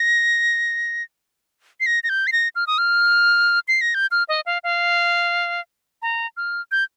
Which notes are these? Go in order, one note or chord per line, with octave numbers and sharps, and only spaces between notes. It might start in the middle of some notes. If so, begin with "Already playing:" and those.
Already playing: A#6
C7
A#6
A#6
G6
C7
A#6
F6
D#6
F6
C7
A#6
G6
F6
D#5
F5
F5
A#5
F6
G6